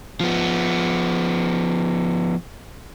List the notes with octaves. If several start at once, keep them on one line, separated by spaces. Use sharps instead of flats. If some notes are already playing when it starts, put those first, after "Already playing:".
F3 B3